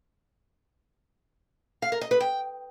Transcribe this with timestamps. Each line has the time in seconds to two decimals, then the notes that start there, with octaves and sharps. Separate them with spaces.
1.82 F5
1.92 A#4
2.01 D#5
2.11 B4
2.20 G5